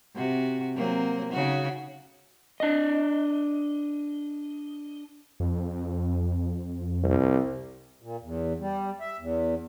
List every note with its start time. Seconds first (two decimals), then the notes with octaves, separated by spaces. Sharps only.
0.15 C3 F#4
0.76 F#3 A#3 C4
1.32 C#3 D#4 F#4
2.60 D4 D#5
5.40 F2
7.03 C2
8.01 A#2
8.22 E2
8.60 G3
9.01 E5
9.19 E2